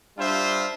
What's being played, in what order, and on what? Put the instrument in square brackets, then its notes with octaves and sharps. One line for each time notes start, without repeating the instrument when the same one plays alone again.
[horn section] G3 D4 F4 C5 E5